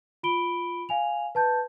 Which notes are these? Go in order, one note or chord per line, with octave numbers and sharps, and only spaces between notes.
F4 B5 D7 G7
F5 G#5 F7
B4 A5 G6